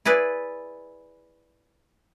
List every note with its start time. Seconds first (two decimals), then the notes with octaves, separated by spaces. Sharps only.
0.05 E4 G#4 B4 D5